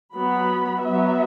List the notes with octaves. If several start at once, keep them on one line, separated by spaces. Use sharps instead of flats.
F#3 B3 B5
F#3 B3 E5